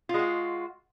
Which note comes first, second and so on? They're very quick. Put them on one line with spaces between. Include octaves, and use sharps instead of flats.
F4 G#3 F#4